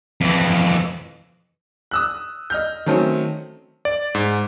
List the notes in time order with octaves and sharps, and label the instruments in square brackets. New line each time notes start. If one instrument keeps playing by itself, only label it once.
[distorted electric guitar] F2 E3
[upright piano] D#6 E6 F#6
D#5 F6 G6
D#3 F#3 A3 C4 C#4
[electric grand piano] D5
G#2